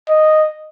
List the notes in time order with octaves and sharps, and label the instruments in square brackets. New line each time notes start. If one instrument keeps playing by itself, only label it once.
[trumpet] D#5